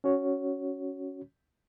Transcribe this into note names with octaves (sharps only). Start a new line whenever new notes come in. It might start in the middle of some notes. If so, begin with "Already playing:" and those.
C#4 F#4 C#5